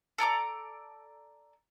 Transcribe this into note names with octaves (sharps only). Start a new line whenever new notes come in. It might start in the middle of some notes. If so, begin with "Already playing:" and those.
A4 D5 A#5 D6